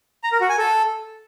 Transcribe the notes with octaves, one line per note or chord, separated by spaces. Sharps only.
A#5
A#4
F#4
G#5
A4